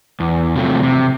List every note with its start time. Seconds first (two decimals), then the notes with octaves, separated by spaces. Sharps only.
0.20 E2
0.56 C3 F3 F#3 A3
0.83 C3